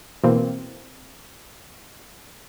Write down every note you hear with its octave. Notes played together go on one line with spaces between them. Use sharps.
B2 E3 A#3 C4